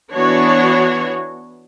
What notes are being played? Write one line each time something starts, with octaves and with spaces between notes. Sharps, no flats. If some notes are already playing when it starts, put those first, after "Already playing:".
E3 B3 D4 F#4 C#5